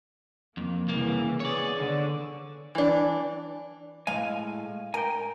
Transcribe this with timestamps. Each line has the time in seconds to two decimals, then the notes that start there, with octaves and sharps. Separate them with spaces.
0.57 F2 A#3
0.88 C2 C#3 E3 A#3
1.40 B3 G#4 C#5 D5
1.75 D3
2.75 E3 D4
4.07 A2 G#3 F5 G#5
4.94 A#4 G5 G#5